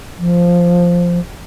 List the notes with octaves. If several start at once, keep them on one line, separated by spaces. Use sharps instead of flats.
F3